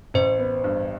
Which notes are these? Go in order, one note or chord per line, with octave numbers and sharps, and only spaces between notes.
A1 C5
B3
G2